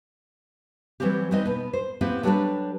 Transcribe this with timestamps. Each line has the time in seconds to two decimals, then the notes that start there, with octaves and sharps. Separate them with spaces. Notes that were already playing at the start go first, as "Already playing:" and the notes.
1.00 E3 F#3 G3 C4 G4
1.31 G3 B3 C4 D#4 D#5
1.45 B2 B3
1.73 C5
2.01 B3 C4 E4 F4 G4 B4
2.23 F#3 G3 D4 G4 A4 B4